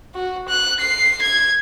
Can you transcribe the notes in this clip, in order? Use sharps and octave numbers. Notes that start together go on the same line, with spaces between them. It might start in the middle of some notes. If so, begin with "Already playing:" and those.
F#4
F#6
C7
G#6